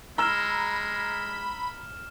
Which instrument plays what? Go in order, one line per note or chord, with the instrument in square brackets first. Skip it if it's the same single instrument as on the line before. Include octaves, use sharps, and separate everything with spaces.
[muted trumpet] G#3 [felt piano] A#5 E6 [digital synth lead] B5 [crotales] F6 E7 G7